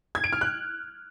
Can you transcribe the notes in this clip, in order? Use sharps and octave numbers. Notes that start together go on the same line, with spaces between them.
G#6
D7
F6
F#6